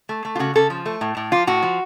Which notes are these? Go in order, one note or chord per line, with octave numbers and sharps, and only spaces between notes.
A3
A3
F4
C#3 F#4
C#3 A4
F3
A3
A2
A2
F3 F4
A2 F#4
F3